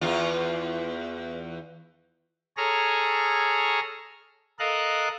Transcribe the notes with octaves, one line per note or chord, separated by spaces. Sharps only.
E2 F4
G#4 A4 C#5 A#5 F6
A4 A#4 D#5 F5 F#6